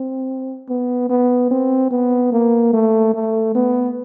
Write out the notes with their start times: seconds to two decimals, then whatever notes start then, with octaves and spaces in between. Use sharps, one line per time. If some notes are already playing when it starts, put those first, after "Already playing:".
Already playing: C4
0.69 B3
1.10 B3
1.51 C4
1.91 B3
2.33 A#3
2.73 A3
3.14 A3
3.55 B3